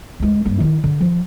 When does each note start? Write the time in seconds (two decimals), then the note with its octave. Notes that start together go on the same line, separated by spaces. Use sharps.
0.20 D2 G#3
0.45 G2 A#3
0.60 D#3 E4
0.84 D3
1.01 F3